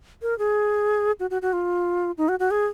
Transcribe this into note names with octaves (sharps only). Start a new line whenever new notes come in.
A#4
G#4
F#4
F#4
F#4
F4
D#4
F#4
F#4
G#4